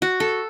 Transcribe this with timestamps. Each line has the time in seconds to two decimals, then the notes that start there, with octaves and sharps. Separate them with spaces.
0.02 F#4
0.20 A4